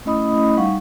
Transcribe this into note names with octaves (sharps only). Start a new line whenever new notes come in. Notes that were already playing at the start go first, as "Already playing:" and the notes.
A3 C#4 E4 D#5 B5 D#6
G3 D#4 F5 F#5 C#6